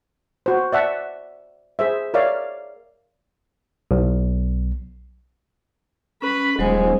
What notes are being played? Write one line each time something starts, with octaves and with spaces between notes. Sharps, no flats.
F#4 C5
D5 E5 F#5 A5
G#4 C5 E5
A#4 C#5 D5 E5 F5
B1
C#4 B4 B5
D#1 F#3 G#3 C5 G#5